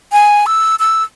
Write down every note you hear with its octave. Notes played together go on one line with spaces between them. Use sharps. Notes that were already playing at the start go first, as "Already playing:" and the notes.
G#5
E6
E6